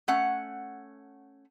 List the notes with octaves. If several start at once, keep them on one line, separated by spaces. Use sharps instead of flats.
A3 C#4 F#5